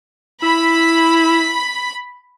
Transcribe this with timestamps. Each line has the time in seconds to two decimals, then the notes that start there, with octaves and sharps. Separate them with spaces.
0.43 E4 B5